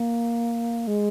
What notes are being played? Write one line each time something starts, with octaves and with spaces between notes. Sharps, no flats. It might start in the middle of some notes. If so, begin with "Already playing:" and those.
Already playing: A#3
G#3